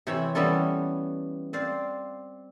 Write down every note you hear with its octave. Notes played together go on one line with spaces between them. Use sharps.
C3 E3 C4 C#5 E5 B5
E3 G3 B3 C#4 A4
C4 D5 F5